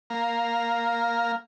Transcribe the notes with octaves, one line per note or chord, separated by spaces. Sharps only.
A#3 F5 A#5